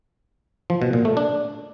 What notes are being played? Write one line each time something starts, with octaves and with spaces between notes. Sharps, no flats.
F3
B2
A#2
A3
D4